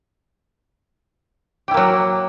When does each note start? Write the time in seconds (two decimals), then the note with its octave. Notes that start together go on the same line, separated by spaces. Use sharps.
1.68 G4
1.71 E4
1.74 A#3
1.77 F#3